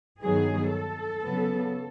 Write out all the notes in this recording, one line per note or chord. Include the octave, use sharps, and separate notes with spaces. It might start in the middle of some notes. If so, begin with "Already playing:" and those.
G2 D#3 F#3 B3 G#4
A4
C#3 F#3 B3